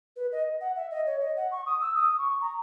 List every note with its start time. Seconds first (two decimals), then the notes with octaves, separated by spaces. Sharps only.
0.16 B4
0.32 D#5
0.61 F#5
0.76 E5
0.91 D#5
1.06 C#5
1.21 D#5
1.36 F#5
1.52 C#6
1.66 D#6
1.81 E6
1.96 D#6
2.18 C#6
2.41 A#5